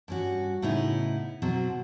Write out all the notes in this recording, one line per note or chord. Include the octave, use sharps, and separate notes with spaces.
G2 C#4 F#4
A2 C#3 B3 D#4 E4
B2 F#3 C4